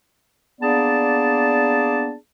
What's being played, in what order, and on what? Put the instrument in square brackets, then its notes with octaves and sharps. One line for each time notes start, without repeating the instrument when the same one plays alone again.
[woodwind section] A#3 B3 D4 G#4 D5 A5